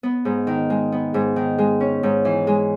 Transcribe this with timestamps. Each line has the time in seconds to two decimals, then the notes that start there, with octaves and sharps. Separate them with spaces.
0.03 B3
0.25 G#2
0.47 D#3
0.70 G#3
0.92 B3
1.14 G#2
1.36 D#3
1.58 G#3
1.80 C#4
2.03 G#2
2.25 E3
2.47 G#3